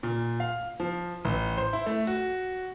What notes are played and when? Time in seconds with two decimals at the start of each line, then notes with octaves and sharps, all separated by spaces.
0.03 A#2
0.40 F5
0.80 F3
1.25 A1
1.58 C5
1.73 E4
1.86 A3
2.07 F#4